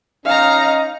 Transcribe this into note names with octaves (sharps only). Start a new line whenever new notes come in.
C#4 D#4 F5 A#5